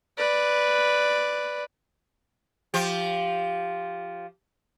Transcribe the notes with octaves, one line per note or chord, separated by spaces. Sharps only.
B4 D5
F3 G4